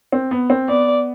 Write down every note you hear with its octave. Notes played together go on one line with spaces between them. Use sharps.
C4
B3
C4
B3 D5